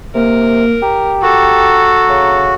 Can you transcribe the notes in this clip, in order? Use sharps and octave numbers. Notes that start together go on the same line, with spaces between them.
C3 A#3 A#4
G4 A#5
F#4 A4
C#3